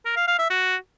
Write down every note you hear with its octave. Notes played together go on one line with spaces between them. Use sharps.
A#4
F5
F5
E5
F#4